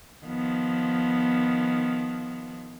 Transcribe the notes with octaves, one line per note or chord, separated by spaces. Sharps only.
D#3 F3 B3